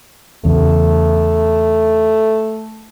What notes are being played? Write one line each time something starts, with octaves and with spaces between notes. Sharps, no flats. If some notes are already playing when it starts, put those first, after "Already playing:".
E2 C#3 A3